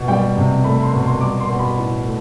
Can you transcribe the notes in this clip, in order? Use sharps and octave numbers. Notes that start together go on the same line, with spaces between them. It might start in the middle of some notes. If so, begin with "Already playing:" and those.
Already playing: B2
G3 G5
C3
A3 B5
C6
B2
C6
G3 D6
C6
B2
B5
A2
A3